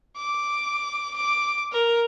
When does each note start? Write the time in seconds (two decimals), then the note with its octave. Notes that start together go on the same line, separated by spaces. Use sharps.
0.17 D6
1.16 D6
1.72 A#4